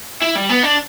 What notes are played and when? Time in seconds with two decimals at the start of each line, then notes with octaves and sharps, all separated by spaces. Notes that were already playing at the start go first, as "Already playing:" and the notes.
0.22 E4
0.35 G3
0.49 B3
0.63 D4